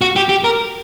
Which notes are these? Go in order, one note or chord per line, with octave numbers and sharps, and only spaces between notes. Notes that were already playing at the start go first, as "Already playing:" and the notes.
F#4
G4
G4
A#4